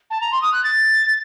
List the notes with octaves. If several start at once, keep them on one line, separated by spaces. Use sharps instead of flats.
A5
A#5
C6
D#6
F#6
A6